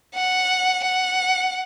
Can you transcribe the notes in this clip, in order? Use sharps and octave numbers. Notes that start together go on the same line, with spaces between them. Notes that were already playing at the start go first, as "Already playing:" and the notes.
F#5
F#5